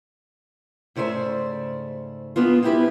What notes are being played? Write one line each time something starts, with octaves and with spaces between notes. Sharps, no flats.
G#2 C#3 A3 C5 D5
G#3 B3 D4 F4
G#3 C4 E4 F4 G4 B4